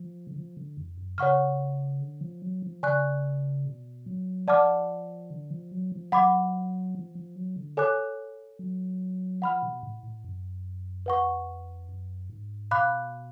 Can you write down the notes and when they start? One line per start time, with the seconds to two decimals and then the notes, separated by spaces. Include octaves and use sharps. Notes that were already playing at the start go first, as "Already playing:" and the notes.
Already playing: F3
0.27 D3
0.36 F3
0.57 D3
0.77 F2
0.98 F#2
1.18 C#3 C#5 F#5 C#6 F6
2.01 D3
2.21 F3
2.42 F#3
2.62 F3
2.83 C#3 D5 G#5 C#6 F#6
3.65 B2
4.06 F#3
4.48 F3 D5 F#5 A5 D6 F6
5.30 D3
5.51 F3
5.71 F#3
5.92 F3
6.12 F#3 F#5 B5 D6
6.95 F3
7.15 F3
7.36 F#3
7.56 D3
7.77 A4 C#5 G#5 D6 F#6
8.59 F#3
9.42 F3 F#5 B5 F6
9.62 B2
9.83 A2
10.03 A2
10.24 F#2
11.06 F2 B4 F#5 C#6
11.89 F#2
12.30 G#2
12.71 B2 F5 B5 D6 F#6